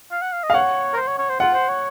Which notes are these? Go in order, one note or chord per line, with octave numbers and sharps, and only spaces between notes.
F5
F#5
F5
D#5
F5
C#5 F#5
A#4
C5
C#5
C#5
C5
F4 F#5
C5
C#5